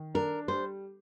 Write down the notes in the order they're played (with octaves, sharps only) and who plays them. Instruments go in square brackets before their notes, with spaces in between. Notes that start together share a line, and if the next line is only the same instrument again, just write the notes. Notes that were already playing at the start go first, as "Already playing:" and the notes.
Already playing: [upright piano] D#3
[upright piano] D4 [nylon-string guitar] A#4
[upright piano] G3 [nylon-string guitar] C5